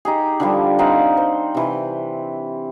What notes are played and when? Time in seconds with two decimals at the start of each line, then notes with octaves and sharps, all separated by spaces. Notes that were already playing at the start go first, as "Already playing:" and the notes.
0.05 D#4 G4 G#4
0.40 D3 F3 G3
0.79 C4 D#4 F5 F#5
1.17 C5
1.55 C3 E3